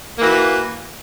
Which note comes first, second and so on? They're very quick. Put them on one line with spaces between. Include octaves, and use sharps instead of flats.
A#3 E3 F#4